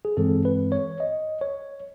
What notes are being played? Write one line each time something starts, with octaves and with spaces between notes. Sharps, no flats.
G#4
G2 E3 G#3 C4 A4
B4
C#5
D#5
C#5